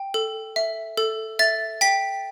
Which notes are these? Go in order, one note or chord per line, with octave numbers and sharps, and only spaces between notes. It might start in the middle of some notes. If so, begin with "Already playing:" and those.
Already playing: G5
A4
E5
A4
E5 A6
G5 B6